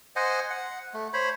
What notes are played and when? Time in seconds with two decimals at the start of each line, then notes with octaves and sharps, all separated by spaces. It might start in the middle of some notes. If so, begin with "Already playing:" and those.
0.16 C5 D#5 F#5 G#5
0.50 F#5
0.94 A3
1.13 C5 C#5 B5